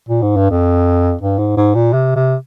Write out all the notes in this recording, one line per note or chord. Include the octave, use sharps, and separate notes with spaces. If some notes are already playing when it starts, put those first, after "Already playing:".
A#2
G#2
G2
F2
G2
G#2
G#2
A#2
C3
C3